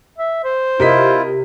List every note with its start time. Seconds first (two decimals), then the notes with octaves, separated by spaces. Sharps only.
0.18 E5
0.44 C5
0.80 C3 E4 F4 A#4 D#5 B6